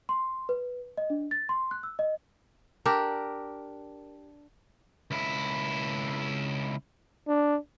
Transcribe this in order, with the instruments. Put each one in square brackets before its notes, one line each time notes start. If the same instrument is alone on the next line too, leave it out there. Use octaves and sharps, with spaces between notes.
[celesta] C6
B4
D#5
D4
A6
C6
F#6
E6
D#5
[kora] D4 G4 A#4
[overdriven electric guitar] C#2 E4
[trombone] D4